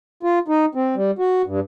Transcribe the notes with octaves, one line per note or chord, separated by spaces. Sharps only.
F4
D#4
C4
G3
F#4
G2